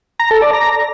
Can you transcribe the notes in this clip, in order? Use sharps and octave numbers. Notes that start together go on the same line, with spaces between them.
A#5
A4
D5
A#5